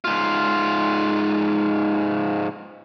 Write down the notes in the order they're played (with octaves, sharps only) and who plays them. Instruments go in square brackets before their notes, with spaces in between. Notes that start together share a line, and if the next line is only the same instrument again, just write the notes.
[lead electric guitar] G#2 F4